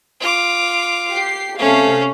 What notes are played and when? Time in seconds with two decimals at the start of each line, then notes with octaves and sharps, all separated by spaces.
0.20 F4 D6
1.13 G4 C7
1.59 C3 A3 C#4 F5